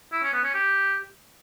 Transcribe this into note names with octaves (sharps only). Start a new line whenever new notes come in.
E4
C#4
B3
C#4
G4